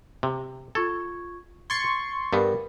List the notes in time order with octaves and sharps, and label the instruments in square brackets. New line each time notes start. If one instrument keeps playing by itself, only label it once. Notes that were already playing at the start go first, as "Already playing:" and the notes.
[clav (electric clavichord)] C3
[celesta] F4 C#6 G#6 [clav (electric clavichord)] A4
[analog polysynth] C6 C#6 [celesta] G#6 A6 C#7
[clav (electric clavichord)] G2 G3 B3 [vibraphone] A#4